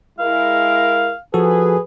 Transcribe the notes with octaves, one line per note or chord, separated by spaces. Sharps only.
G#3 E4 A#4 F5
F3 F#4 G#4 A4 B4